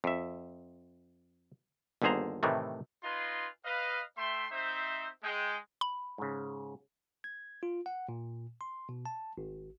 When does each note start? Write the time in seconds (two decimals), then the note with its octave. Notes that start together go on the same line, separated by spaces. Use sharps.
0.04 F2 E5
2.02 G1 D#2 D3 G#4 C5 A#5
2.43 A2 C3 D#3 E3 A3
3.04 D#4 F4 B4 D#5 G#5 C6
3.65 B4 D#5 F5
4.18 A3 E5 G5 C6
4.51 C4 D#4 C5 E5
5.23 G#3 G5
5.81 B5
6.18 G#2 C#3
7.24 G#6
7.63 F4
7.86 F#5
8.09 A#2
8.61 C6
8.89 B2
9.06 A5
9.38 G#1